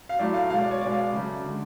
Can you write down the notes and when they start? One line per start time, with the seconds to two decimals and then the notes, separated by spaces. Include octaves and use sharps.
0.09 F5
0.19 A2 F#3 A3 D5
0.34 F5
0.50 B2 G#3 F5
0.61 D5
0.71 C#5
0.81 B2 G#3 D5
0.91 F5
1.01 D5
1.12 C#3 F#3 A3
1.44 D3 G#3